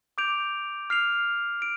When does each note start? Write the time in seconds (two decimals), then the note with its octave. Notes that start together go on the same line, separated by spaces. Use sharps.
0.18 D6 G6 D7 F7
0.90 F6 C7 F7
1.62 D7